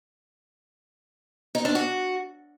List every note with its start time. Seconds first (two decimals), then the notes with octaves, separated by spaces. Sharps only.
1.55 D#4
1.65 D4
1.75 F#4